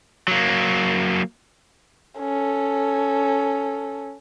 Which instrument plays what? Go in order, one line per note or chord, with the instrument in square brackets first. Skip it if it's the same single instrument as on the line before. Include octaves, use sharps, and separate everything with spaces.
[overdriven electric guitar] F#3 A#3
[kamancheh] C#4 A4